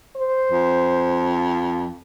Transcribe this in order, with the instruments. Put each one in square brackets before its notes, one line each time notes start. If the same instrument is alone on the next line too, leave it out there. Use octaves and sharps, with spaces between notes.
[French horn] C5
[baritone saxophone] F2